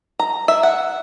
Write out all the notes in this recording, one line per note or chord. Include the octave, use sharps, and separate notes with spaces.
A#5
E5
F#5